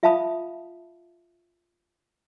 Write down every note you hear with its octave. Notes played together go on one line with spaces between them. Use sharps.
F4 E5 F5 A5 B5 D#6